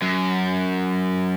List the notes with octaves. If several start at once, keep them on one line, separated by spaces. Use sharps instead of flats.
F#2